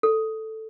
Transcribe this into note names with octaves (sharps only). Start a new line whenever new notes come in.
A4